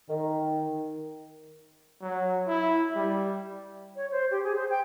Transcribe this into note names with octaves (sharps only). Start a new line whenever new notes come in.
D#3
F#3
E4
G3
C#5
C5
G4
G#4
C5
G5